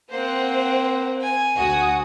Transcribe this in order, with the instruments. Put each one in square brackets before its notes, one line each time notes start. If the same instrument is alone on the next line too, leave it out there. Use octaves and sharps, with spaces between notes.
[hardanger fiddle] A#3 C4 [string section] C5 F#5
[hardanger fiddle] G#5
[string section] D2 F#4 D#6